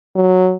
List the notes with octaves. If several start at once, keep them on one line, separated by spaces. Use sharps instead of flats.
F#3